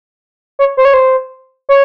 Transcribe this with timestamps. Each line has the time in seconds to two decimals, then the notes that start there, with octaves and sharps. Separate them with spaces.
0.59 C#5
0.77 C5
0.85 C#5
0.94 C5
1.69 C#5